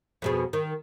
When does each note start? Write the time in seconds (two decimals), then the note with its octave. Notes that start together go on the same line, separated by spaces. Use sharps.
0.22 F2 B2 G#4
0.53 D#3